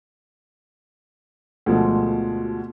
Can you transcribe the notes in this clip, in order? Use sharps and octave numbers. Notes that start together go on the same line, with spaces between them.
D2 B2 F3 G#3